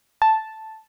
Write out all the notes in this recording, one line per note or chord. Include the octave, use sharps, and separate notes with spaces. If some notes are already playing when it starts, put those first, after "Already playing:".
A5